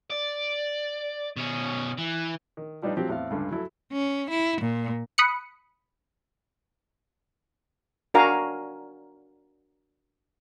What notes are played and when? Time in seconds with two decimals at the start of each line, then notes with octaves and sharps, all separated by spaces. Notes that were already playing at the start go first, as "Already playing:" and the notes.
0.10 D5
1.37 B2 C#4
1.98 E3
2.57 D#3
2.82 F3 G3 D4 D#4 B4
2.97 F3 F#3 C4 G4
3.09 E2 A2 C4 F5
3.30 C#2 G2 D3
3.51 F#3 E4 A4
3.92 C#4
4.30 E4
4.61 A#2
5.18 B5 D#6 F#6 C#7
8.14 D4 F#4 A#4 F5 G#5 A#5